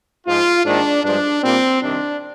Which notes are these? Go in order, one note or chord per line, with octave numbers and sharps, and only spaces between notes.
G#2 F3 G#3 F4
G#2 D#3 A#3 D4
G2 F3 G#3 D4
A#2 G3 A#3 C4
C2 C3 D#3 D4